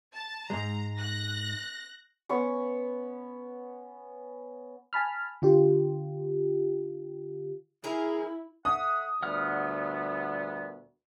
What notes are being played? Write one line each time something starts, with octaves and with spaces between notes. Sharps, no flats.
A5
G#2 G#3 A#5
F#6 A#6
B3 C#4 C#6
G#5 A5 B5 F6
D3 F4 G4
E4 G#4 A#4
A4 E5 F#5 D#6
D2 A#2 G3 B3 F#5 F6